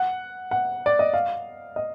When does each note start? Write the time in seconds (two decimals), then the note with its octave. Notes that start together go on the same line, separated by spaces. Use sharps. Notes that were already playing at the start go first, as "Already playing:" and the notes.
Already playing: F#5
0.51 F#5
0.86 D5
0.99 D#5
1.14 F5
1.76 D#5